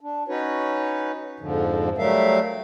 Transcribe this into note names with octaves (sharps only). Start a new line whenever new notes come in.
D4
C#4 D#4 F#4 B4 C#5
F2 G#2 D3 F3
F#3 G3 A3 A#4 E5 F5